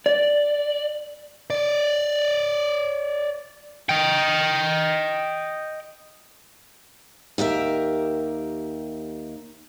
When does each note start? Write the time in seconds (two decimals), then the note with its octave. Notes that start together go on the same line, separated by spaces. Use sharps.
0.06 D5
1.50 C#5 D5
3.89 D#5 G5
7.38 D#2 G4 A#4 E5